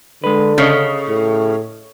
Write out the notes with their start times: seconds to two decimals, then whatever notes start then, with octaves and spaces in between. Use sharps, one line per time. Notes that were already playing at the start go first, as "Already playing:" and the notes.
0.24 D3 G#3 B4
0.58 C#3 A4 C#5 D#5
1.09 A2